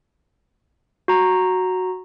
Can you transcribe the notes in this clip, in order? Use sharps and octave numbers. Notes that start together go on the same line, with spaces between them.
F#4 A#5